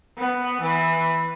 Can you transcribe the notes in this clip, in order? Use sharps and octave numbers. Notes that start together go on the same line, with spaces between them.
B3
E3